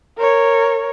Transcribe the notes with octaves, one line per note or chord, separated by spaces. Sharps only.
A#4 C#5